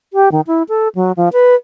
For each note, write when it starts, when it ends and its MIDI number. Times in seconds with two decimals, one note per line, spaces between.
0.13 0.29 67
0.32 0.41 51
0.47 0.63 64
0.69 0.88 69
0.95 1.12 54
1.17 1.29 53
1.33 1.55 71